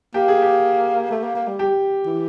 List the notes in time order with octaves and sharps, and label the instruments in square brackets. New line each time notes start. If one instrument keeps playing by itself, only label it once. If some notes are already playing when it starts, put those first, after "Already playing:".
[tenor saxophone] A#3 [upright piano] G4
[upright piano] G#4
G4
[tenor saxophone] A3
A#3
A#3
G3
[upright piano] G4
[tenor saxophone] E3